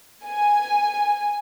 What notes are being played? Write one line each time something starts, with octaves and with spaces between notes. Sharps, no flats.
G#5